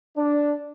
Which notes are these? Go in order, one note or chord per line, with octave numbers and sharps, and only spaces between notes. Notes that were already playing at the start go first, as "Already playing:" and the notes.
D4